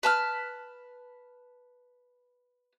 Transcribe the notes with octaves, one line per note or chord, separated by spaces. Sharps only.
B4 A5 F6